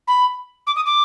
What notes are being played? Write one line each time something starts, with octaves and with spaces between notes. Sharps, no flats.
B5
D6
D#6
D6